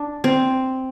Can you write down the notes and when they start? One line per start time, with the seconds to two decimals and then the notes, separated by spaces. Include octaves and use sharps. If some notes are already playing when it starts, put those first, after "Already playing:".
Already playing: D4
0.24 C4